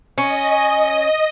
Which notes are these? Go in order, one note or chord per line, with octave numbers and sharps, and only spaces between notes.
C#4 D#5